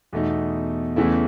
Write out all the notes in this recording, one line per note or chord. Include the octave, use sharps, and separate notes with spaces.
E2 B2 A3 D#4
E2 C#3 E3 A3 E4